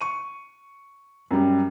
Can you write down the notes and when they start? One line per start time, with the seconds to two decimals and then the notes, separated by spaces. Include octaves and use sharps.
0.01 C#6 D#7
1.31 F#2 G3